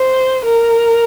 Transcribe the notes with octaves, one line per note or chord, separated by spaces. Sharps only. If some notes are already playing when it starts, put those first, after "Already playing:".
Already playing: C5
A#4